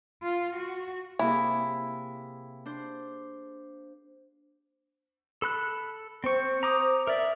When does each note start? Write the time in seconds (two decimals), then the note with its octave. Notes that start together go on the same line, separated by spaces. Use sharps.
0.23 F4
0.56 F#4
1.19 C3 A#3 E4 G#4
2.66 D4 C5
5.42 A4 B5 F#6
6.24 C4 C5 C#6
6.63 A#5 D6 D#6
7.07 A#4 D5 E5